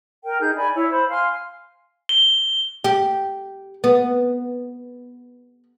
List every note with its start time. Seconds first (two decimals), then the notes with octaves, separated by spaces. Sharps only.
0.25 A#4 G5
0.40 D#4 G#4 G6
0.56 D5 G#5 B5
0.75 E4 C#5
0.90 C5 B5
1.09 F5 G#5 C6 F6
2.09 G7
2.84 G4
3.84 B3